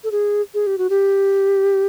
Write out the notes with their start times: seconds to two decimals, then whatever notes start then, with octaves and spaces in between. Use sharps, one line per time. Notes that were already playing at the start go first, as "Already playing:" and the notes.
0.04 A4
0.12 G#4
0.54 G#4
0.67 G4
0.78 F#4
0.90 G4